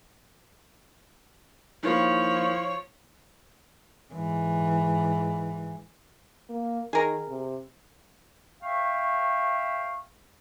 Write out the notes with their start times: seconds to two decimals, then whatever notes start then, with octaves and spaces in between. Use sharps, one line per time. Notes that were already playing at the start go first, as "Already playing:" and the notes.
1.83 D#3 F3 A#3 E4 C#5
4.14 G#2 E3
6.49 A#3
6.93 D#3 G#4 A#4
7.28 C3
8.63 E5 F5 G5 C#6